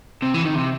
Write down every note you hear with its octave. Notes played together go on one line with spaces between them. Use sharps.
C3
E3
D#3
C3